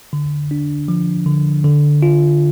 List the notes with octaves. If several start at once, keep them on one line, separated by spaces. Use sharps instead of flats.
D3
D4
F3
D3
D3
F4